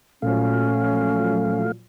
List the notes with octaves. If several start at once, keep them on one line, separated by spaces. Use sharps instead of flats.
A#2 F3 F#3 A3 C#4 F5